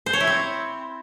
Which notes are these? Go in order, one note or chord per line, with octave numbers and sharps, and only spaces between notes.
C5
C#5
E4
C4